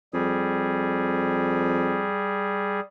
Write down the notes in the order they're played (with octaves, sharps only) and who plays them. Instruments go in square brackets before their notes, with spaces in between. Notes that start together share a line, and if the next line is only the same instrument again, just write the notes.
[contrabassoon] F2 [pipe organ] G3 G#4